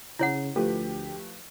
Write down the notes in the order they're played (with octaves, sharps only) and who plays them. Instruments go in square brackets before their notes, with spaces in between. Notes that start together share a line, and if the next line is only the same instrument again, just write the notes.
[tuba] C#3 [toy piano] E4 C#5 F#5
[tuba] D2 [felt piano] F3 A3 B4 [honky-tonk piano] G4